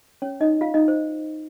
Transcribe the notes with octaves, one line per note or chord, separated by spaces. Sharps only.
C#4 C#5
D#4 D#5
F4 F5
D#4 D#5
C5